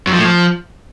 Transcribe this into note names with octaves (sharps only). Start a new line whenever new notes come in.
F#2
F3
A2
F3